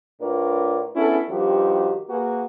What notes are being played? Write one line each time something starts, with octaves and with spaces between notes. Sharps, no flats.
A2 D4 F4 A#4 B4 D5
B3 C#4 D4 E4 G#4 A4
G2 D#3 F3 F#4 G4
A#3 F#4 G#4 B4